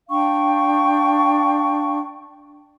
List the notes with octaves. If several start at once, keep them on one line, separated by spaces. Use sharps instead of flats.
D4 F5 G5 C#6